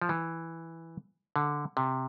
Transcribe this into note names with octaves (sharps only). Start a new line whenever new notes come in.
F3
E3
D3
C3